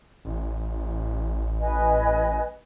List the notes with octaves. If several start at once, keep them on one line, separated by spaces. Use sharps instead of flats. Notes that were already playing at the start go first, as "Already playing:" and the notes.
A1
B4 D#5 G#5